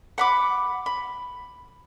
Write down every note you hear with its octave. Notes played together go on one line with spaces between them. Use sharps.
F#5 B5 D6
B5